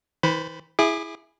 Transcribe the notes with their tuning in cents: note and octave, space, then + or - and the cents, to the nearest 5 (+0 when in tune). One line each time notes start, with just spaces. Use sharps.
E3 -45 C5 -30 B5 +0
E4 +0 G#4 +0 D6 +35